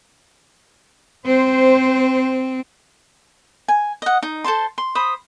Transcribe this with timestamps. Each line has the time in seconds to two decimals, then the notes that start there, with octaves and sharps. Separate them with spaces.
1.26 C4 C5
3.68 G#5
4.02 D#5 F#5
4.23 D#4
4.44 A4 C5 A5 C6
4.78 C6
4.95 C5 B5 D#6